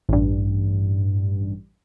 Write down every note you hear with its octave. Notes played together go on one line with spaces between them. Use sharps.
A1 G2